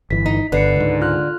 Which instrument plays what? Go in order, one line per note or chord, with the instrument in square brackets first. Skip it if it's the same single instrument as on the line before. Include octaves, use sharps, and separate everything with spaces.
[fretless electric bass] G1 E3 [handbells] B6
[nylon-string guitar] D#4
[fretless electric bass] G1 [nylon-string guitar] D3 [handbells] B4 C7 C#7
[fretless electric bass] C#2 G#2
[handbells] F4 F6 F#6